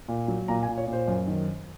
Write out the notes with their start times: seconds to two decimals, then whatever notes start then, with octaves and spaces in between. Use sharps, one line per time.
0.08 A#2
0.28 F#3
0.48 A#2 A#5
0.63 G#5
0.68 A#2
0.78 C#5
0.87 A#2
0.93 C5
1.08 F#2
1.27 D#3